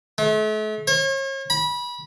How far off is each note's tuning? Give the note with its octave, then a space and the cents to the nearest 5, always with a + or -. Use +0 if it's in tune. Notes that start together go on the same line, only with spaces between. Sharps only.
A3 -40
C#5 -40
B5 -25